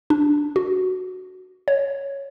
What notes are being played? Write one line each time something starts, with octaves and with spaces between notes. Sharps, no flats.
D4
F#4
C#5